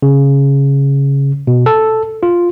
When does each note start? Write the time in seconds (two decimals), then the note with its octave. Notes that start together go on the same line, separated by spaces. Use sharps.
0.02 C#3
1.47 B2
1.66 A4
2.23 F4